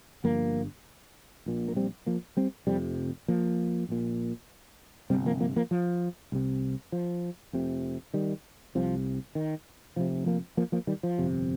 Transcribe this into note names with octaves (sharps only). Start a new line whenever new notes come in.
G1 G2 F3 A#3
A#1 A#2
A#3
G3 C4
F3 A#3
G3 C4
F1 F2 C3 G3 C4
F3 A#3
A#1 A#2
G1 F2 C3 G3 C4
F3 A#3
F3 A#3
F3 A#3
F3
C2 C3
F3
F1 F2 C3
D#3 G3
C2 C3 F3
D#3
F1 F2 C3 F3
F3 A#3
F3 A#3
F3 A#3
D#3 G3
F3
G1 F2 C3